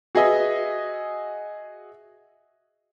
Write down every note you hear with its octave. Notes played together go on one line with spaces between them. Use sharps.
F#4 G#4 B4 D#5 E5